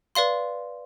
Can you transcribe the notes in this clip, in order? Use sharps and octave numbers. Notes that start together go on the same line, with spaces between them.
B4 D5 F5 C6